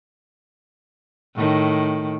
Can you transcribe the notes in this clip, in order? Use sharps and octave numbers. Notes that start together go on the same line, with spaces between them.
A2 D#3